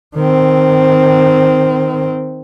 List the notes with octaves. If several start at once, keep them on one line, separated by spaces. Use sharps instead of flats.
D#3 C4